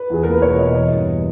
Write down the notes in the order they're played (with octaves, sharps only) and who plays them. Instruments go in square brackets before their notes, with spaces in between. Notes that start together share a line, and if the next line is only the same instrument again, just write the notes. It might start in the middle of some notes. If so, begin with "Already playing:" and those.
Already playing: [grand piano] B4
E2 G#4
A#3 A#4
B4
E1 C#5
B2 D#5
E3 D#5
G2